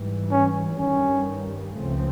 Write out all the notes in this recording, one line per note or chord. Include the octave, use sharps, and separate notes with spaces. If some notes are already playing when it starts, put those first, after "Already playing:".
Already playing: G#2 E3 G3
C#4
G2 D#3 G3 C#4
C#2 C#3 F3 A3 C4